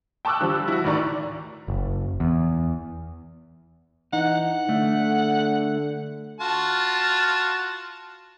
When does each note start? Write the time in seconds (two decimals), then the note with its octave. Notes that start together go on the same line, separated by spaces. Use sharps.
0.25 G5 A5 C#6 D6 E6 F#6
0.41 D3 F3 G3
0.68 E4 F#4
0.84 D2 A2 D#3 D5 A#5 C#6
1.68 F#1
2.20 E2
4.13 E3 D#4 F#5
4.69 D3 A3
6.40 F4 F#4 A5